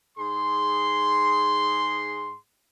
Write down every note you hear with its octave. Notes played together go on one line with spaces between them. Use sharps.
G#2 G#4 C6